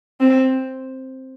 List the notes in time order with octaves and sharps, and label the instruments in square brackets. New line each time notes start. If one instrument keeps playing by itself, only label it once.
[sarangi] C4